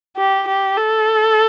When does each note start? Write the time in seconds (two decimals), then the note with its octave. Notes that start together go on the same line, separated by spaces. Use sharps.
0.17 G4
0.47 G4
0.77 A4